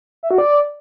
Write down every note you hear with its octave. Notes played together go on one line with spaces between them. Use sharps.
E5
F#4
D5